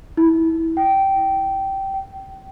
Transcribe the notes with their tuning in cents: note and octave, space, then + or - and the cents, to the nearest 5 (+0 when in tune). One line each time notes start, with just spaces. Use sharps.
E4 -20
G5 -15
G5 -25